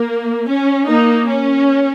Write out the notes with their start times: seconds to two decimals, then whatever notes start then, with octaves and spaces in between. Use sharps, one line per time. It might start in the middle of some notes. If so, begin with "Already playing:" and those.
Already playing: A#3
0.49 C#4
0.88 A#3 D#4
1.27 C#4